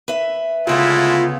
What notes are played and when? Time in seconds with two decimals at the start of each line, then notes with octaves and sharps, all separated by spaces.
0.08 B4 E5
0.67 D2 C#3 G#3 A3 B3 E4 F4